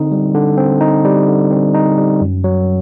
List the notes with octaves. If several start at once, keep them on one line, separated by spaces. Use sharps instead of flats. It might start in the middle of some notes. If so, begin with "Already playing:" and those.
Already playing: D3 C4 D#4
G3
D3
C4
D#4
G3
D3
C4
D#4
G3
F#2
F#3